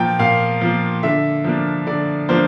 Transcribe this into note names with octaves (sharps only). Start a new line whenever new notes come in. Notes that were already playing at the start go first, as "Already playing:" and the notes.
Already playing: A#2 F3 A#3 G5 A#5
A#2 F5
F3 A#3
D3 E5
F3 A#3 D4
D3 D5
F3 A#3 D4 C5